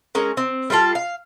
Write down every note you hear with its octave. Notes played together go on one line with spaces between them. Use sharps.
G#3 C#4 A#4
C4
G3 A3 F4 A4
F5